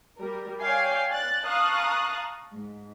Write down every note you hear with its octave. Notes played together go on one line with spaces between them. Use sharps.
G3 A#4
C#5 D5 F5 G5 G#5 C7
D5 F#6 A6
F5 A5 A#5 C#6 D#6 F#6
G#2